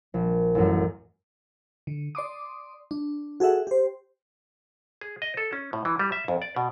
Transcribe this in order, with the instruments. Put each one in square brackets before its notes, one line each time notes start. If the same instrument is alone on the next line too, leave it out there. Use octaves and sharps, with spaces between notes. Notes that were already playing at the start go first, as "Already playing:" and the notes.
[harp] A#1
A1 F#2
[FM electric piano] D3
D5 C6 D6 D#6
D4
F#4 G#4 A4 E5 F#5
G4 C5
[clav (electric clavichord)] G#4
D#5
A4
C#4
A2
E3
G3
E5
F2
D5
B2